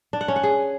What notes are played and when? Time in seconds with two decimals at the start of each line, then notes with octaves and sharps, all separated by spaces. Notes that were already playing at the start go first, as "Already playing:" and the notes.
0.13 D4
0.21 F#5
0.28 C#4
0.36 F#5
0.43 G#4